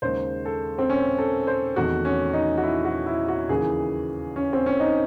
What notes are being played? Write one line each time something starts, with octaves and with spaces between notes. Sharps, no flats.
D#2 C#3 G#3 C5
A4
C4
C#4
A4
C5
E2 C3 D#3 A3 F#4
C#4
D#4
F#4
E4
F#4
E4
F#4
D#2 C#3 E3 G#4
C#4
C4
C#4
D#4